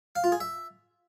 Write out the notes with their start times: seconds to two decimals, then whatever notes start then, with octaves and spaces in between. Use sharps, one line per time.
0.16 F5
0.24 F4
0.32 G#4
0.40 E5